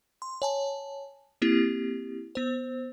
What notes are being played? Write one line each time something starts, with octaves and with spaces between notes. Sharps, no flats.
C6
C#5 G#5 A5
A#3 C4 E4 G4
B3 C5